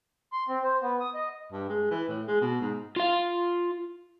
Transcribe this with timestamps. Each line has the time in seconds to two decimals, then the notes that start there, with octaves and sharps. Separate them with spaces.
0.32 C6
0.48 C4
0.63 C5
0.82 B3
1.00 D#6
1.14 D#5
1.52 G2
1.69 G#3
1.91 E3
2.09 A2
2.28 G#3
2.41 B2
2.61 G#2
2.96 F4 F5